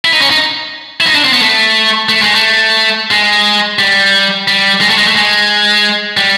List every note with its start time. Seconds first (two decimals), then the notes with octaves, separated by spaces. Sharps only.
0.05 E4
0.13 D#4
0.21 C#4
0.30 D#4
1.01 E4
1.06 D#4
1.15 D4
1.24 C4
1.33 B3
1.41 A3
2.09 A3
2.22 G#3
2.35 A3
3.11 G#3
3.79 G3
4.48 G3
4.81 G#3
4.90 A3
4.98 G#3
5.07 A3
5.16 G#3
6.17 G3